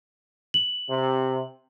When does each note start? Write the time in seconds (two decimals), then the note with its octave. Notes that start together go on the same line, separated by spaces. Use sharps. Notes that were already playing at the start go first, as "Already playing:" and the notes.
0.54 F#7
0.90 C3